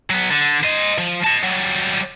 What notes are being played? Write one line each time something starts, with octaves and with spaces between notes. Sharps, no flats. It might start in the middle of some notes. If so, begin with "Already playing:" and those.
F#3 B3
D3
C5 D#5
F3
D#5 A5
F#3 G3